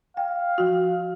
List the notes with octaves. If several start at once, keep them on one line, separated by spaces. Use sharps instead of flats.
F5 G5
F3 F#4